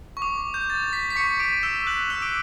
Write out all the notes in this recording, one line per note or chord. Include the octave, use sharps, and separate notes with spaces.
C#6
D6
G6
A6
A6
B6
B6
C#6 C#7
D6 D7
E6 E7
F#6 F#7
E6 E7
D6 D7